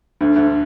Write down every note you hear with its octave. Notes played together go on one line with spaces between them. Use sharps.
D2 D3
D2 D3